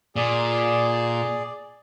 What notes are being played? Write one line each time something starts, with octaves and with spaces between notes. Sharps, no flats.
A#2 G#4 D5